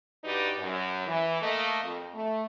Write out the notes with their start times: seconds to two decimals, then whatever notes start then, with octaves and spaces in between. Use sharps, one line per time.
0.24 G2 D#4 F#4 G4 B4 D5
0.59 F#2
1.07 E3
1.42 A3 A#3 D#5
1.84 F2
2.14 A3